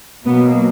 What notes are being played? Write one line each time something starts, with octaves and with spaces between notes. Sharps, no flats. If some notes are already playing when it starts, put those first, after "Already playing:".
B2 F#3 A#3 B3